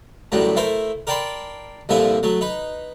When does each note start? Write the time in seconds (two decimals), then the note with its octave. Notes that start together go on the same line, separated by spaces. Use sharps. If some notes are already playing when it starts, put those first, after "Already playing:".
0.32 F#2 A2 D3 F#3 G3
0.56 A3 E4 A#4 C5
1.07 A#4 D5 G5 A5 B5 C6
1.89 C2 A#2 D3 F3 E4 G#5
2.23 F#3 A3
2.41 D#4 B4